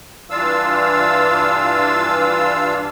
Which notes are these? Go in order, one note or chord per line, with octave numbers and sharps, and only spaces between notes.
G2 E3 D4 F4 F5 E6